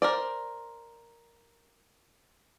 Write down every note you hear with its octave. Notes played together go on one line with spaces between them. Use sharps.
A#4 C5 D5